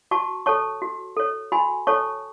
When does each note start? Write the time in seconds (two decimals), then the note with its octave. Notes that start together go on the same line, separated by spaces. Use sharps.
0.11 F#4 A5 C#6
0.46 A4 C#5 A5 C#6
0.82 F#4
1.17 A4 C#5
1.52 F#4 G#5 B5
1.87 A4 C#5 A5 C#6